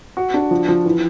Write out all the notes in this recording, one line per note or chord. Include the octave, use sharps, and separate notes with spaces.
F#4
D4
F3
F3
E3